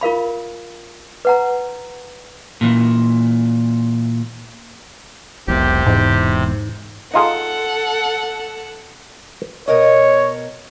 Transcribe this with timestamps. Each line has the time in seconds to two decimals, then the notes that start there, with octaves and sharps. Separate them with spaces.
0.01 F4 A#4 F5 B5
1.25 B4 F#5 A#5
2.61 A#2 E3
5.48 E1 B1 E2 C3 G4
5.86 E1 E2 G#2
7.14 D#4 F4 G#4 A4 F#5
9.68 B2 A#4 C#5 D#5